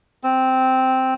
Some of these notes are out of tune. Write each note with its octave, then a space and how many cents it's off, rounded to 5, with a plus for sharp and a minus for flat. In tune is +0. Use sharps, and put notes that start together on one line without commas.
C4 -5